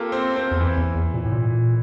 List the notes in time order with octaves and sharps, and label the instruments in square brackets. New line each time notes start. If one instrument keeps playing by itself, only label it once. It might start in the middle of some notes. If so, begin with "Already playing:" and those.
Already playing: [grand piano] A#3 C4 F4 G4 A4 A#4
C4 C5
C4 C5
[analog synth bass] E2
[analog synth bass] F2 [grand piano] E3 E4
[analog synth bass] E2
E2
A#2
A2
A#2